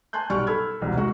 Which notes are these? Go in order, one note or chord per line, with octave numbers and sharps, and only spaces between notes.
G#5 A5 C6 F#6 G6
B1 G3 D5 C#6 F6
A4 B5 E6 F6 G#6
E1 C2 B2
G#3 F#4